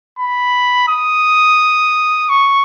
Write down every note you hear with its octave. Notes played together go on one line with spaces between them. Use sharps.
B5
D#6
C#6